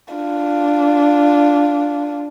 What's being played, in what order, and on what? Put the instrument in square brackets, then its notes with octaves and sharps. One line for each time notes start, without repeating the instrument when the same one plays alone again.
[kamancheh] D4 F4